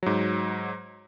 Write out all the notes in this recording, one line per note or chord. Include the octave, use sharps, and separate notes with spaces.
G#2 F#3